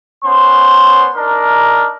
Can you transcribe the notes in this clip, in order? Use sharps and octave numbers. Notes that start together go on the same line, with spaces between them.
B3 C#4 C5 C6
D4 D#4 A#4